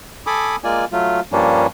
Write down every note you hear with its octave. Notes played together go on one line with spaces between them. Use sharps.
A4 G#5 B5 D6 D#6
G#3 A#3 F4 D5 G#5
F#3 A3 F4
G2 F3 G3 A#3 C#4 D4